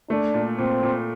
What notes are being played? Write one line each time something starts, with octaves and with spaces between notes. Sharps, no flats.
A3 D4
A#2
A#2 C4
A#2